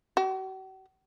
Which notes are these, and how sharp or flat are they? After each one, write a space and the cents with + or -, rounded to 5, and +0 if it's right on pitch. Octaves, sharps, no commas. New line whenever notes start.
F#4 +45